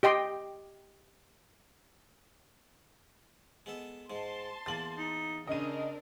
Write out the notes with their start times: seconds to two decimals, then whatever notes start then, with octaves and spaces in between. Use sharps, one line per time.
0.03 G4 D#5 G5 C6
3.66 G#3 B3 A4
4.10 G#2 G#3 A5 C6
4.66 E2 A#3 A6 F#7
4.98 D#4
5.47 C#3 C4 D4 A#4 D#5 D#7